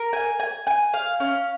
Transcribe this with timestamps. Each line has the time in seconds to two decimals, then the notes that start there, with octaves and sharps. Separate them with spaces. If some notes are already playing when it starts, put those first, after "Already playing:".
Already playing: A#4
0.13 G#5
0.40 G#5
0.67 G#5
0.94 F5
1.20 C#4